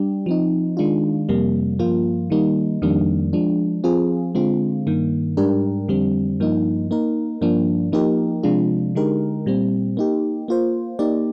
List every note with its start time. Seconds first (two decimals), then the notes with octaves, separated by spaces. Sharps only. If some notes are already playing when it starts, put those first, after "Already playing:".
Already playing: G3 D4 G4
0.26 F3 C4 D#4
0.77 D#3 G#3 D4 F4
1.29 F2 C3 G3 A#3
1.79 G2 F3 A#3 F4
2.30 D#3 G3 A#3 D#4
2.82 F2 D#3 G3 A#3 D4
3.33 F3 G#3 D4
3.84 F3 C4 F4 G#4
4.35 D3 G#3 C4 F4
4.87 G2 D#3 A#3
5.37 G#2 G3 D4 G4 A#4
5.88 F2 D3 G3 C4
6.40 G2 F3 A#3 D#4
6.91 A#3 D#4 A#4
7.41 G2 F3 A#3 D4
7.92 F3 A#3 D#4 G4 A#4
8.43 C3 F3 G#3 D4 F4
8.95 D3 G#3 D#4 G4 A#4
9.46 A#2 G3 C4
9.97 A#3 D#4 G4
10.48 A#3 F4 C5
10.99 A#3 D#4 G4 D5